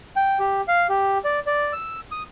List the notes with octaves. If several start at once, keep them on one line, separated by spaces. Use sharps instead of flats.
G5
G4
F5
G4
D5
D5
E6
D#6